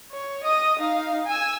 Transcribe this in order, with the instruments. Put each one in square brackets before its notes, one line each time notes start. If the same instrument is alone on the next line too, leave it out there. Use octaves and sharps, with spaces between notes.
[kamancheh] C#5
D#5 D#6
D#4 F5
G#5 E6